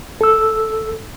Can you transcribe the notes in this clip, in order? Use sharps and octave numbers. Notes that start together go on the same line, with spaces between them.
A4 E6